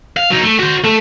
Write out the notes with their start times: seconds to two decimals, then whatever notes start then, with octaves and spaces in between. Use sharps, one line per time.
0.17 F5
0.30 F#3 D#4
0.43 A3
0.59 F#4 C5
0.84 A3